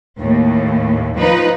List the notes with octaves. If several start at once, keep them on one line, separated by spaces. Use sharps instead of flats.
D#2 A2
F3 D#4 B4